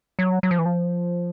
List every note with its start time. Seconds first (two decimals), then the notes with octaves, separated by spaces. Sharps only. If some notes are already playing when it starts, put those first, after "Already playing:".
0.19 F#3
0.43 F#3
0.51 F3
0.59 E3
0.65 F3